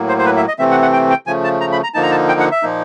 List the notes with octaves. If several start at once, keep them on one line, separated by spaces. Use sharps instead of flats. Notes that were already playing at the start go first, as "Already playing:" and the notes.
Already playing: A2 F#3 A#3
C5
C5
B4
E5
D#5
C3 E3 A3 C4 E5
F#5
F#5
G5
G5
C#3 F3 A3 G#5
A5
A#5
B5
A#5
D3 F3 A#3 D#4 A5
A#5
A5
G5
F#5
E5
A#2 F3 A#3 D#4